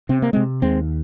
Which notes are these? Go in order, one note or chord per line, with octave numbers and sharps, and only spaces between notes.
C3 C4
A#3
C3 G#3 C4
D#2 G#3 C4